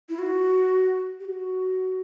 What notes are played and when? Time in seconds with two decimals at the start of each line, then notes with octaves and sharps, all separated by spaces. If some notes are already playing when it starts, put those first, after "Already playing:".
0.09 E4
0.19 F#4
1.20 G4
1.25 F#4